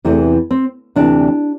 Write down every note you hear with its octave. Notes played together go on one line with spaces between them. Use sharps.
E2 C3 E3 A3
C4
D2 C3 E3 D4